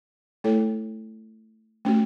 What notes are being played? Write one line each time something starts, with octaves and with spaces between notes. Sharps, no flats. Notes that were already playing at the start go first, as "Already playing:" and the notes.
A3 E4 A4 C#5
A3 C#4 F#4